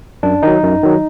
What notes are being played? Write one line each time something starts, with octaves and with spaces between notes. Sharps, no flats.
F#2 D4
D#3 F#3 D#4
F#2
D#3 F#3